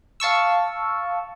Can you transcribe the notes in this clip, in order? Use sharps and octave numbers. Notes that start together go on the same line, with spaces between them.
F5 A5 C#6 E6